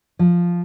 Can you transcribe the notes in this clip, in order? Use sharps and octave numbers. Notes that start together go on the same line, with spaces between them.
F3